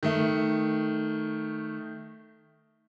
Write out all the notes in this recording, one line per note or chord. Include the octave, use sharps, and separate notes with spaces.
D#3 A3